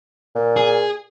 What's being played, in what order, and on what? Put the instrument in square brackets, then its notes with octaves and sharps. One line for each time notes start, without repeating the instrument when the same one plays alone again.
[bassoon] A#2
[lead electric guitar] G#4